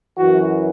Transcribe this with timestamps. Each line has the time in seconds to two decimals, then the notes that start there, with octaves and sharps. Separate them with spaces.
0.18 F#2 E3 F#4